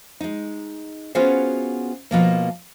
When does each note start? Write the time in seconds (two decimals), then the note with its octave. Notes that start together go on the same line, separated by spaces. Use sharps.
0.20 G#3 D#4
1.15 B3 C#4 F4 F#4 G#4 C5
2.11 B2 F3 A#3